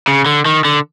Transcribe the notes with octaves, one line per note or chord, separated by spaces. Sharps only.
C#3
D3
D#3
D3